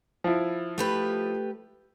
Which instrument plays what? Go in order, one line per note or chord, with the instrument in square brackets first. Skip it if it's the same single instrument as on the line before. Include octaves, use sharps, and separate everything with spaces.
[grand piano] F3 E4
[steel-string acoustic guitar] A3 G4 B4